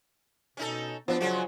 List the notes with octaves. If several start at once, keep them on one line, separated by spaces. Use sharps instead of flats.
B2 C#4 D#4 A4
F3 F#3 B3 D4
C#3 F#3 G#3 F#4